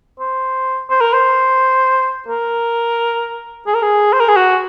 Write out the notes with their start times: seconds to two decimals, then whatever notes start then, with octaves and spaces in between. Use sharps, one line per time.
0.20 C5
0.90 C5
1.01 A#4
1.14 C5
2.28 A#4
3.67 G#4
3.75 A#4
3.82 G#4
4.13 C5
4.21 A#4
4.28 G#4
4.36 F#4